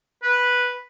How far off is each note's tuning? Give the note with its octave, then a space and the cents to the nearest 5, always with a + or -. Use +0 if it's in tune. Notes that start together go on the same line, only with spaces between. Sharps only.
B4 -5